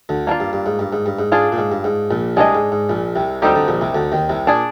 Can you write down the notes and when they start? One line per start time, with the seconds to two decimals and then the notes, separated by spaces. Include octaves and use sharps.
0.09 D2 D3
0.27 A#3 D4 F4
0.40 G2
0.53 G2
0.66 G#2
0.79 G2
0.93 G#2
1.06 G2
1.19 G#2
1.32 G#2 D4 F4 G#4
1.52 A#2
1.58 G#2
1.72 G2
1.84 G#2
2.11 A#1 A#2
2.37 C2 C3 G#3 D4 G#4 D#5
2.55 G#2
2.72 G#2
2.89 A#1 A#2
3.16 C2 C3
3.42 D2 D3 G3 C4 D#4 G4
3.55 D2 D3
3.68 A#1 A#2
3.81 C2 C3
3.94 D2 D3
4.12 D#2 D#3
4.29 C2 C3
4.47 A#2 D4 G#4 D5